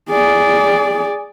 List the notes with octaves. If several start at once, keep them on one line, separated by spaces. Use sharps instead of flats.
G#4 D5